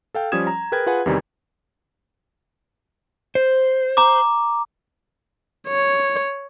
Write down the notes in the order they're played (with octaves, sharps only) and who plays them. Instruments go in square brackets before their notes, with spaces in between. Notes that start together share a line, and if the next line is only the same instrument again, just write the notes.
[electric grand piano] A4 F5 G5
F3 G3 C#4 D#6 G#6 E7
A#5
G#4 A#4 B4 G5 G#6
F4 G#4 B4 F#5 G#5
E2 C3 D#3 E3 G3
[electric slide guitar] C5
[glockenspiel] A#5 D6
[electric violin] C#5